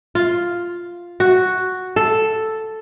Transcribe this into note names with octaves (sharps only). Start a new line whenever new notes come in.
F4
F#4
A4